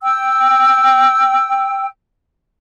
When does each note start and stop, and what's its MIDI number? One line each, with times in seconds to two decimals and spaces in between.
0.03 1.87 79
0.03 1.87 88